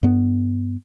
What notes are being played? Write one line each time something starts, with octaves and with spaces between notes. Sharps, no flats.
G2 B3